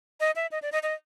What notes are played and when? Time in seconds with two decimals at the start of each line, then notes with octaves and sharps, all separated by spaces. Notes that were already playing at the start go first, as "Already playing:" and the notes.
0.20 D#5
0.36 E5
0.51 D#5
0.62 D5
0.72 D#5
0.83 D#5